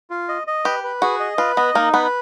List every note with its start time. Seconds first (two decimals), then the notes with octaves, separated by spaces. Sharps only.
0.10 F4
0.28 D#5
0.47 D#5
0.65 G4 B4
0.84 B4
1.02 F#4 G#4
1.20 D#5
1.38 F4 B4
1.57 B3 D#5
1.75 A#3 D#4
1.93 B3 B4